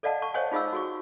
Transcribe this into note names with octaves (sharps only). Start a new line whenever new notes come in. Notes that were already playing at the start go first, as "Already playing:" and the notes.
A4 D5 D#5 F5 F#5 A5
A5 C#6
C5 C#5 D#5 F5 F#5 G#5
D#4 F4 G#4 D#5 F5 E6
F#4 G#4 C#6